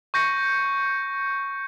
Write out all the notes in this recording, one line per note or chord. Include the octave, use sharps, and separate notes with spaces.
C#6 G6 A#6 C#7